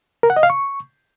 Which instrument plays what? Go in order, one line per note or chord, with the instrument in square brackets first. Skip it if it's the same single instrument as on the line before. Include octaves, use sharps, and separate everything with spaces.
[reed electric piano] A#4
F#5
D#5
F5
C#6